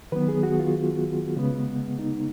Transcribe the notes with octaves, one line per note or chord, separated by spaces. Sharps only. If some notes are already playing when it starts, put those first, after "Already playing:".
D#3 F#3 B3 B4
G#4
F#4
F4
C#3 G#3 B3
D#4